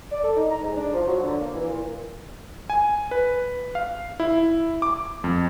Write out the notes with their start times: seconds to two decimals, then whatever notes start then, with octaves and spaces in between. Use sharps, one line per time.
0.11 D5
0.24 A4
0.36 D#4
0.51 A#5
0.63 G#2
0.76 D4
0.94 F3
1.06 F#3
1.22 D3
1.41 A#3
1.54 E3
1.67 A#2
2.70 G#5
3.11 B4
3.75 F5
4.20 E4
4.82 D6
5.24 F2